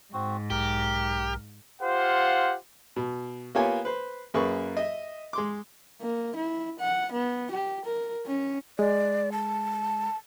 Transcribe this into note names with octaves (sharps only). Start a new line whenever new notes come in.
G#2 C4 F#4
B1 G4 A#4
F4 G4 C5 F5 F#5
B2
A#3 B3 F4 G4 C#5 G#5
B4 C5
F#2 A#3 G#4 B4 C#6
D#5 E5
G#3 C6 D6
A#3
E4
F#5
B3
G4
A#4
C#4
G#3 D5
A5